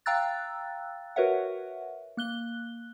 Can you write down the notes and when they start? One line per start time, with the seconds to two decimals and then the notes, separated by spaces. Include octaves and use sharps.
0.06 F5 G5 A#5 E6 F#6 A6
1.16 F#4 A#4 B4 C#5 E5 F#5
2.17 A#3 F#6 G7